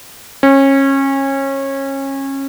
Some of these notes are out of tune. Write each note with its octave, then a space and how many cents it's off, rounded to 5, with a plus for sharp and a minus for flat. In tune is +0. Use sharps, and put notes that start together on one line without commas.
C#4 -25